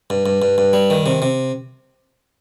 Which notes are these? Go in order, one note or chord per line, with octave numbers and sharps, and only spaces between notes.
G2
G2
G2
G2
G3
D#3
C3
C3